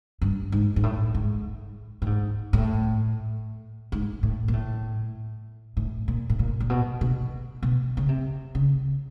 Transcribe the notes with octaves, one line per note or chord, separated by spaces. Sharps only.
G2
G#2
G#2
A2
G#2
A2
G#2
A2
G#2
A2
A#2
A2
A2
A#2
A2
A#2
A#2
B2
B2
B2
C#3
C3
C#3